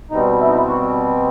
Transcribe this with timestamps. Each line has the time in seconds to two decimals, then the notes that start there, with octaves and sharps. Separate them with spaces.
0.11 B2 G3 C4 D#4
0.40 E4
0.48 D#4
0.54 E4
0.67 F#4